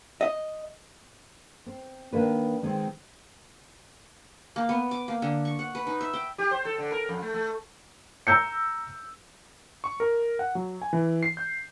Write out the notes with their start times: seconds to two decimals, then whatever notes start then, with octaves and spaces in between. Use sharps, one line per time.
0.21 D#5
1.66 C4
2.13 D#3 A#3 D4 B4
2.63 D#3 G#3 C4
4.56 A#3
4.69 B3
4.91 D6
5.08 A#3
5.22 D3
5.45 C#6
5.59 F#5
5.75 B4
5.87 D#4
6.01 E5
6.13 G5
6.38 G4
6.51 C5
6.65 A4
6.78 D3
6.92 A#4
7.09 F2
7.22 A3
7.34 A3
8.27 A#5 E6 G6 C#7
9.84 C#6
10.00 A#4
10.39 F#5
10.55 F#3
10.82 G#5
10.93 E3
11.23 C7
11.37 G6